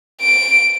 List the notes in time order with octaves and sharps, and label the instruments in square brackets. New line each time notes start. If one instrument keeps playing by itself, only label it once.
[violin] D7